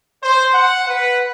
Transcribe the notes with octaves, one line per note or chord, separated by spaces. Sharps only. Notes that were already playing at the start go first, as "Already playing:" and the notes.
C5
F#5
B4